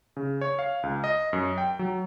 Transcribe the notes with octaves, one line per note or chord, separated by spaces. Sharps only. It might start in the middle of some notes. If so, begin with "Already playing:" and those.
C#3
C#5
F5
C#2
D#5
F#2
G5
F#3